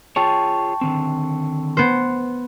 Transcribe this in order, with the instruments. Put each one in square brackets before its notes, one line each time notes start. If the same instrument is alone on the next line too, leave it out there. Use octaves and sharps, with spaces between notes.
[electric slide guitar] F4 G#4 C#5 [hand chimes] G5 A5 C#6
[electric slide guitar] D3 D#3 C4
[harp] B3 C5